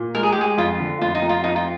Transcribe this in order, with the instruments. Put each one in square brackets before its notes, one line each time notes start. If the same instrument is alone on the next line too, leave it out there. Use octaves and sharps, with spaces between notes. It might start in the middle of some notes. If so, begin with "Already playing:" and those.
Already playing: [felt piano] A#2
[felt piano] G#3 [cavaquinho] A#4
[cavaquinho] G#4
G4
[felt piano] G#3 [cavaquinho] G#4
[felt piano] F2 [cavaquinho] F4
[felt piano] D3
[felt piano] F2 [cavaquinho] F4
[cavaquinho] D#4
[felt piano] F2
[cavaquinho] F4
[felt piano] F2 [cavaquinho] D#4
[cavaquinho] F4